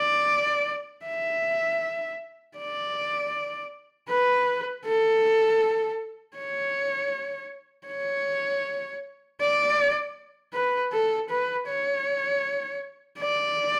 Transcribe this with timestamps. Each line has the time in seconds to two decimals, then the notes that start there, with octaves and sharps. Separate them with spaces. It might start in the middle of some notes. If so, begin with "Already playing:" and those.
Already playing: D5
1.06 E5
2.58 D5
4.09 B4
4.86 A4
6.36 C#5
7.88 C#5
9.41 D5
10.53 B4
10.93 A4
11.30 B4
11.68 C#5
13.19 D5